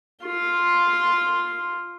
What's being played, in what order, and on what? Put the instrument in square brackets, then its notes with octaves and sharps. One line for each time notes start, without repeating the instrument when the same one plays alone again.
[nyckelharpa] F4 C6